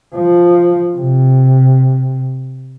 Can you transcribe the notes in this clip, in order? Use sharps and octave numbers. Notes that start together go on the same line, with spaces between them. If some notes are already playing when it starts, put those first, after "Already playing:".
F3
C3